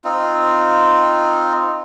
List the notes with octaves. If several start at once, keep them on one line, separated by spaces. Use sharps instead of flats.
C4 D#4 F4